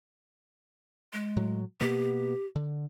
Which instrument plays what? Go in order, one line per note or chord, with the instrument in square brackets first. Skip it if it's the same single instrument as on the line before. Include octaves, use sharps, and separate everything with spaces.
[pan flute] G#3
[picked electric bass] A2 F#3
[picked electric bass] B2 A#3 B3 [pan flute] G4
[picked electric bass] D3